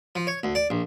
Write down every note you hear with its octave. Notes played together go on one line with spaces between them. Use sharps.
F3
C#5
D2
D5
A#1